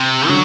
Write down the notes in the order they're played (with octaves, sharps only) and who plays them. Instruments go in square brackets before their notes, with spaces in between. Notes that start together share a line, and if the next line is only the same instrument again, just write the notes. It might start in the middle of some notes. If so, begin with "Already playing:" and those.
Already playing: [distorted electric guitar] C3
[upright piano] D3 [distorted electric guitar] F#3